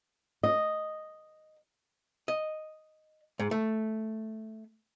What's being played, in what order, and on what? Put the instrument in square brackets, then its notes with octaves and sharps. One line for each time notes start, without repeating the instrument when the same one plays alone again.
[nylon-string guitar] D#5
[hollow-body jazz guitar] D#5
G#2
A3